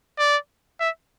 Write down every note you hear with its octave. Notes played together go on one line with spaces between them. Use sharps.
D5
E5